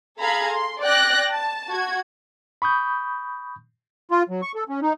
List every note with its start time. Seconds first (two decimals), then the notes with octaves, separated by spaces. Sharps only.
0.19 G#4 A4 F5 A#5 B5 G#6
0.52 C6
0.82 D5 G5 F#6 A#6
1.33 A5
1.69 F#4 G#6
2.62 B5 C#6 D#6 G6
4.11 F4
4.29 F#3
4.42 C#6
4.55 A4
4.69 C#4
4.82 D#4